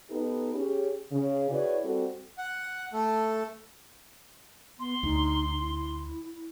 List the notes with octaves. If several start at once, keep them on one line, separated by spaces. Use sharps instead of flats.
B3 D#4 G4 A4 B4
C#4 G4 G#4
C#3
E4 F#4 G#4 B4 C#5 D5
G3 C4 F#4 A4
F#5
A3 A4
B3 C6
D2 D#4
E4